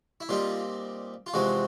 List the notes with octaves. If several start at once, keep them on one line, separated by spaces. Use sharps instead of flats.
E4
A#2 G3 C4 D#4 F4
F4
E2 C3 F3 G#3 C4 F#4